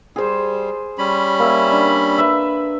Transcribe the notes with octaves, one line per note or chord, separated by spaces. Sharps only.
G3 G#4 C5
G3 C#4 B5
A#3 E5
D4
B4 E5